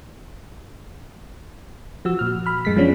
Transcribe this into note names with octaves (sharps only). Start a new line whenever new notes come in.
F3 F#4 E6
A#2 F6
B5 F6
F#2 G#3 B6
F3 G#3 B3 C#4 D4